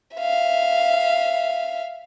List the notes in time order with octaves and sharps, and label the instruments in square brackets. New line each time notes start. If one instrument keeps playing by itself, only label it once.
[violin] E5 F5